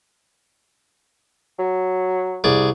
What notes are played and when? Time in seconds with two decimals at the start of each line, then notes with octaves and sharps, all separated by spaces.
1.59 F#3
2.44 C2 G#4 D5